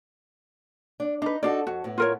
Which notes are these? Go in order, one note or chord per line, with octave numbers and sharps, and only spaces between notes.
D4
D4 D#4 B4
D4 D#4 F#4 A4 D5
F2 F#4
A2 B3
F4 A#4 C#5